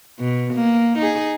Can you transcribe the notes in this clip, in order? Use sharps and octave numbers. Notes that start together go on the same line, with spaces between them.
B2
A#3
D#4 G#4